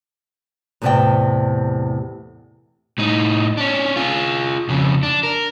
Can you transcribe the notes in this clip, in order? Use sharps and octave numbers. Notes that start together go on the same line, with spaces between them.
E2 A2 C3 C5 D5 G5
A2 D#4
C#4 D4
F4 G#4
F2 C#3
D4
A#4